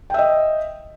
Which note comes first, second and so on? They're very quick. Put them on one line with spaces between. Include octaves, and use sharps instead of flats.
G5 E5 D#5